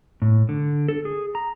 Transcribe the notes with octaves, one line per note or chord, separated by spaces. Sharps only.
A2
D3
A4
G#4
A#5